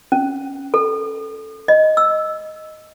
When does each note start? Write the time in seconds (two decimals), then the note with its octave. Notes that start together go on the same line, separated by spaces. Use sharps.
0.12 C#4
0.74 A4
1.68 D#5
1.97 E6